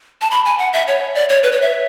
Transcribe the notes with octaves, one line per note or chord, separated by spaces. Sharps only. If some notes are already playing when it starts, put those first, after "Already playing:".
A5
B5
G#5
F#5
E5
C#5
D5
C#5
B4
C#5
E5